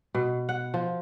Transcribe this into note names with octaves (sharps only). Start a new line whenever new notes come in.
B2
F#5
F3